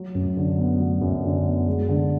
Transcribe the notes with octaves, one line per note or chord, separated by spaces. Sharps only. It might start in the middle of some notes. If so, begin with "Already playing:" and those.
Already playing: F#3
F#2
D3
B3
F#3
F#2
D3
B3
G#3
D3